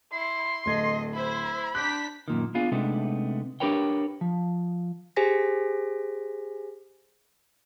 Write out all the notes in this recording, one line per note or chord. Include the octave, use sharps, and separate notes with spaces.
E4 C6
D1 A3 D#5 G#6
E4 C5 B5
D4 G4 F#6 G6 B6
F#2 A#2 D#3
B3 D4 F4 G#4
C3 G#3 A3 B3 D4 D#4
D4 G4 A#4 B4 C#5 G5
F3
G4 G#4 C5 G#5 A#6 B6